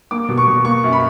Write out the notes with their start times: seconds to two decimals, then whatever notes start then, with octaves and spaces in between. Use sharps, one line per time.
0.11 A#3 D6
0.29 B2
0.38 C#6
0.48 B2
0.65 A#3 C#6
0.84 F#2
0.92 B5